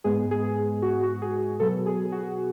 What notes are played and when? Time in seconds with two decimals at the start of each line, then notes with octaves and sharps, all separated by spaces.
0.04 G#2 G#3 B3 G#4
0.31 G#4
0.82 F#4
1.03 F#4
1.22 G#4
1.60 B2 F#3 B3 A4
1.86 G#4
2.12 F#4